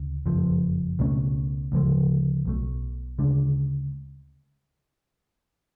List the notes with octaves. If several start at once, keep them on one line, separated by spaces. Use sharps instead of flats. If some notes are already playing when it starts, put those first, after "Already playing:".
Already playing: D2 C#3
F#1 F2 F3
C#2 B2 A3 C#4
D2 C#3 F3 G#3
B1 B2 A3
D2 C#3 G#3 D4